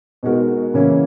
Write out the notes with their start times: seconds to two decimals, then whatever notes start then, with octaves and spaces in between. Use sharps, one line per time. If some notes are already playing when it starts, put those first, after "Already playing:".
0.23 B2 G#3 D#4 F#4 A#4
0.74 C#3 E3 A#3 C#4 E4